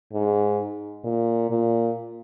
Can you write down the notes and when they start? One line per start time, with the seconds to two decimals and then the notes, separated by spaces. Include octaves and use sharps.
0.13 G#2
1.04 A#2
1.50 A#2